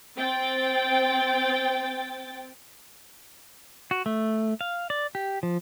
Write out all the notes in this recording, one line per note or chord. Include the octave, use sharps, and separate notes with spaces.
C4 G5 A6
F#4
A3
F5
D5
G4
F3